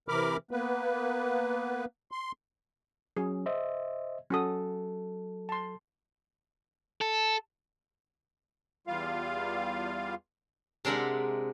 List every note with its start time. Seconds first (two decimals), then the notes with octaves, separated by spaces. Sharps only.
0.09 C3 E3 A#4 B5 D6 F6
0.51 A#3 B3 B4
2.11 C6
3.17 F#3 C#4 G#4
3.46 C5 D#5 E5
4.30 F#3 C#4 F#4 A4 D#6
5.49 A5 C6
7.01 A4
8.87 E2 G3 F4 F5
10.85 C3 G#3 D4 A#4 E5 F#5